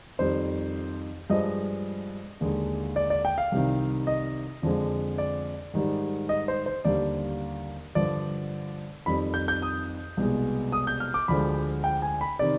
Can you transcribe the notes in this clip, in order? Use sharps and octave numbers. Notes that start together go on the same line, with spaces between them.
F2 D#3 G3 C5
G2 F3 G#3 D#5
D#2 D3 G#3
D5
D5
G5
F5
C2 C3 D#3
D#5
F2 D3 F3 G#3
D5
G#2 D#3 G3
D#5
C5
C5
D#2 D3 G3 D5
G2 D3 F3 D5
F2 D#3 G3 B5
G6
G6
D#6
C2 B2 G#3
D#6
G6
F6
D6
D2 D3 F3 G#3 B5
G5
G#5
B5
C3 D#3 D5